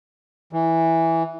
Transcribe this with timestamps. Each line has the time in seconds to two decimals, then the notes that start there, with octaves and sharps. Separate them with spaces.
0.53 E3